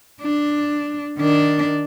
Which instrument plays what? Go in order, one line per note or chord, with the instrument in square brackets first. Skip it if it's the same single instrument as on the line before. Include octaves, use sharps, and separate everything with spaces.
[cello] D4
D#3 D4